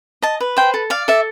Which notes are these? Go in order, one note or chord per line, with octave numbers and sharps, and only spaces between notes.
D#5 A5
B4
C5 G5
A4
D5 F5
A4 E5